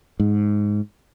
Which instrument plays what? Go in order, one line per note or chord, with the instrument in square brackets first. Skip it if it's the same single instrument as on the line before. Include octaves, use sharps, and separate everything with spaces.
[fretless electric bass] G#2